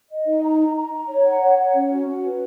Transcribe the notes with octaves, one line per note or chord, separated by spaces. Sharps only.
D#5
D#4
A#5
A#5
A#5
A#5
C#5
F#5
C#5
F#5
C#4
F#4
C#4
B4